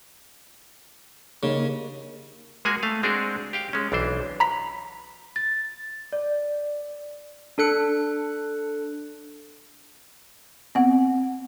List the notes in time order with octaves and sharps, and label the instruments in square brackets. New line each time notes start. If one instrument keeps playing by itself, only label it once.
[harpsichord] C#3 [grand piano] A#3 D#4 G4
[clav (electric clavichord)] G#3 A#3 F#4 G#4 G#5
A3 F5
G#3 C4 D4 F#4 G#4 A#4
G4 F5 G5
G#3 C#4
B1 E3 D4 C5
[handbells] A#5 B5 B6
[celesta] A6
D5
[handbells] D4 A4 F#6 C#7
[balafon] B3 C4 F#5